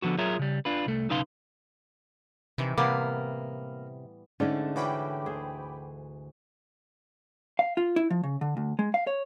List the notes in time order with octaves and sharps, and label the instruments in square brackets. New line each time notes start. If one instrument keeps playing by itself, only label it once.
[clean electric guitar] D3 F3 B3 F#4
F#3 F4 G#4 A#4 C#5 E5
C#3 G3
D4 F4 B4
C2 A3
B1 C#3 D#4 B4 F5 C6
[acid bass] C3 [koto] D#3 E3
[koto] A2 G3 B3 [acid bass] C3 [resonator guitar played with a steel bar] A#3 [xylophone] D6
[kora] G#2 D4 G5 [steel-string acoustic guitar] D3 A3 [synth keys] C#4
[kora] E3 C#4 F#4 [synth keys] G5 B5 D6
[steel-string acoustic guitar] D2 [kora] G#4 C5
[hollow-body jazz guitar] F5
F4
E4
F3
C#3
D3
D2
G#3
F5
C#5